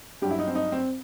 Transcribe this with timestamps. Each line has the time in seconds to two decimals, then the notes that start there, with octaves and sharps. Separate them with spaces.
0.22 G2 F#3 G4
0.31 E4
0.39 D#4
0.47 C4
0.55 D#4
0.72 C4